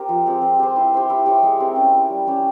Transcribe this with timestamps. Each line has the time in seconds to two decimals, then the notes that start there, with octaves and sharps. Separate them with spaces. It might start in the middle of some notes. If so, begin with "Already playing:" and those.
Already playing: C4 G4 A#4 C5
0.09 F3
0.26 G#3 C4 G4
0.42 C4
0.59 G4 C5
0.76 E4
0.92 G4 C5 E5
1.10 E4
1.26 G4 C#5 E5
1.43 G#3
1.60 C4 G4 A#4
1.76 C#4
1.94 E4 G4
2.10 G3
2.27 C#4 G4 C#5